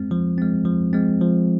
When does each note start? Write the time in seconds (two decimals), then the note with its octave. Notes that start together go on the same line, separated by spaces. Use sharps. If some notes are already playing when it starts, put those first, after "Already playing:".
Already playing: G#3 C4
0.11 F3
0.38 G#3 C4
0.65 F3
0.93 G#3 C4
1.21 F3